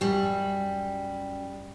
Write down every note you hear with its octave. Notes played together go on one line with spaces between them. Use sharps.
F#2 G3